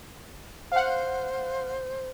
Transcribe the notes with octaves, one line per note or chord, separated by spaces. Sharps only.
C5 F5 F#5